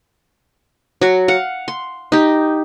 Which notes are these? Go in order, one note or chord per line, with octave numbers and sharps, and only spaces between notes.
F#3 F#4
F5 F#5
C6
D#4 G4